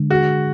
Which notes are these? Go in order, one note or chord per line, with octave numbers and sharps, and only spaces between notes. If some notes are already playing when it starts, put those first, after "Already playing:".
Already playing: D3 G#3 D4
F#4 G#4